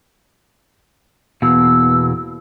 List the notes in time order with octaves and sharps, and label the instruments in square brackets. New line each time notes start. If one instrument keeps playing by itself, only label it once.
[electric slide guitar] E2 B2 A#3 [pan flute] E6